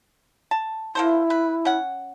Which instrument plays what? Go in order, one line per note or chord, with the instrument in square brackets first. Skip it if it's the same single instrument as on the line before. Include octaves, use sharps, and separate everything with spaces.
[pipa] A5
[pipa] A#3 A4 C5 [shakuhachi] E4
[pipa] B4
C#4 F#5